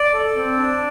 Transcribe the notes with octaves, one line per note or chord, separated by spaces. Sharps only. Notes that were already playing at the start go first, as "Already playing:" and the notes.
Already playing: D5
A4
C4
D4